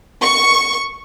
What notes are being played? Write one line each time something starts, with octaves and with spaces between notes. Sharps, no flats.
C#6